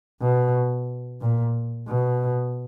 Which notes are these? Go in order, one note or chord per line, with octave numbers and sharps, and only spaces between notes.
B2
A#2
B2